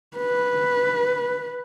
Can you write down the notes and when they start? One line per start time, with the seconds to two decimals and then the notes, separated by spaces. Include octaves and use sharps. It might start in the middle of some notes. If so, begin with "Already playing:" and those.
0.17 B4